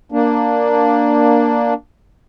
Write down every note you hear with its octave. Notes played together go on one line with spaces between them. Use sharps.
A#3 D4